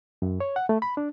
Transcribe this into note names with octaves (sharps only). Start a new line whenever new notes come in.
F#2
C#5
F#5
A3
B5
D4